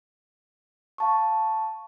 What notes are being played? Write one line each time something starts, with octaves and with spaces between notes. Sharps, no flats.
F5 A5 C#6